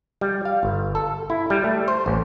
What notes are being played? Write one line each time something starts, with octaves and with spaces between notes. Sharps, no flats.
G3
F5
G1
A4
E4
G3
A3
C5
A1